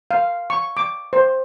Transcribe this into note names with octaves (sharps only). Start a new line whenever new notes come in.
F5
C#6
D6
C5